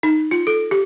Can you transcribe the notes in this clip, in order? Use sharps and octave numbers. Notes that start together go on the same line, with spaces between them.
D#4
F4
A4
G4